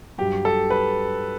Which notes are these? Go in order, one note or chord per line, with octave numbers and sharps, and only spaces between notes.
G2 F#3 G4
A4
B4